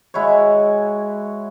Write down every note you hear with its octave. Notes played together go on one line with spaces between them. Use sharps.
G#3 E4 F#4 C#5